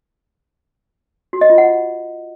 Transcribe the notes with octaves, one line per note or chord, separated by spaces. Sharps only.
F#4
D#5
F4
F#5